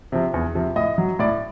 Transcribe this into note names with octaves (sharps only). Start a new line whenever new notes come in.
C3 F3
E2
C3 F3
A2 D#5
F#3
A2 D5